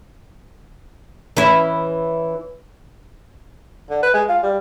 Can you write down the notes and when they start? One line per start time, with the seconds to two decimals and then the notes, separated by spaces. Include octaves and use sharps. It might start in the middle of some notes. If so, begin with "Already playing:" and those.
1.37 E3 C#4 E4
3.90 D3
4.03 B4
4.14 G#3
4.29 F4
4.43 G3